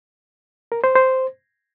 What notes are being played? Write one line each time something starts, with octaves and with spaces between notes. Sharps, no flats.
A#4
C5
C5